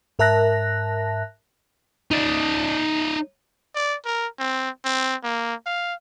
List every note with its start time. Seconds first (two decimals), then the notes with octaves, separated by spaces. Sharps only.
0.19 G#2 A#4 E5 A5 F#6 A#6
2.11 D#4 D5
3.75 D5
4.05 A#4
4.39 C4
4.85 C4
5.23 A#3
5.66 F5